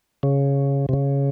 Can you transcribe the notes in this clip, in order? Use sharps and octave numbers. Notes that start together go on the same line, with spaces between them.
C#3
C3
C#3